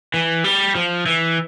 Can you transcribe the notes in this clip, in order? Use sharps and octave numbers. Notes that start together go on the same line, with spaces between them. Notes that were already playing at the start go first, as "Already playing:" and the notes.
E3
G3
F3
E3